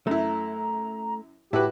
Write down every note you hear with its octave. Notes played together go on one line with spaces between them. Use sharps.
F#2 A3 E4 A#5
A2 E4 F#4 G4 B4